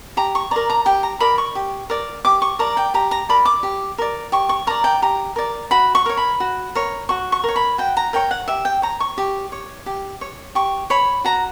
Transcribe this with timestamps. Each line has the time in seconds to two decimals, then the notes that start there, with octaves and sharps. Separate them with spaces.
0.17 G4 A#5
0.35 C#6
0.51 A#4 D5 A#5
0.70 A#5
0.86 G4 G5
1.03 A#5
1.20 A#4 D5 B5
1.38 C#6
1.55 G4
1.90 A#4 D5
2.25 G4 D6
2.42 C#6
2.59 A#4 D5 A#5
2.77 G5
2.94 G4 A#5
3.11 A#5
3.29 A#4 D5 B5
3.45 D6
3.63 G4
3.98 A#4 D5
4.32 G4 C#6
4.49 C#6
4.67 A#4 D5 A#5
4.84 G5
5.02 G4 A#5
5.36 A#4 D5
5.71 F#4 B5
5.95 C#6
6.06 A#4 C#5
6.17 B5
6.40 F#4
6.75 A#4 C#5
7.09 F#4 C#6
7.32 C#6
7.44 A#4 C#5
7.56 B5
7.78 F#4 G5
7.97 A#5
8.13 A#4 C#5 G5
8.31 F#5
8.48 G4 E5
8.65 G5
8.82 C#5 A#5
9.00 C#6
9.18 G4
9.52 C#5
9.86 G4
10.21 C#5
10.55 G4 C#6
10.90 C#5 B5
11.24 F#4 A#5